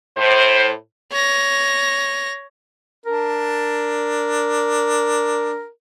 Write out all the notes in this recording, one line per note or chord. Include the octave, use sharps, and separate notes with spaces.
A2 C5
C#5 A#6
D4 A#4